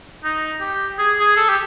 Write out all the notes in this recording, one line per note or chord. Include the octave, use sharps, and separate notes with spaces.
D#4
G4
G#4
G#4
A4
G4